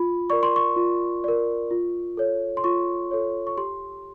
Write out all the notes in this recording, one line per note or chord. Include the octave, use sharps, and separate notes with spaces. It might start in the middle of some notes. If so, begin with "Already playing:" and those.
Already playing: F4 B5
A#4 D5 C#6
C6
C#6
F4
A#4 D5
F4
A4 C#5
C6
F4 C#6
A4 C#5
C#6
G4 C6